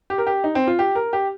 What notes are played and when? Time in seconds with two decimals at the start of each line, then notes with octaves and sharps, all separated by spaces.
0.10 G4
0.18 A#4
0.27 G4
0.44 D#4
0.55 C4
0.67 F4
0.79 G4
0.95 A#4
1.13 G4